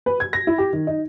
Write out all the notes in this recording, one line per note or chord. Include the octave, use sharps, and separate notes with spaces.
B4
G#6
A#6
E4
G4
D#3
D#4